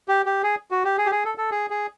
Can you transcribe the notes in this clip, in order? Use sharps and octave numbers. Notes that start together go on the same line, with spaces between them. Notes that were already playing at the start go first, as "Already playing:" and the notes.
G4
G4
G#4
F#4
G4
G#4
G4
G#4
A4
A4
G#4
G#4